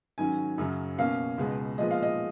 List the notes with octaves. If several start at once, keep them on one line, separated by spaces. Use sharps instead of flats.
G#2 D#3 F#3 C#4 G#5
F#2 C#3 F#3 C#4
B2 A#3 C#4 F5
C#2 B2 G#3 B3
A#2 F3 G#3 B3 D#5
F5
D#5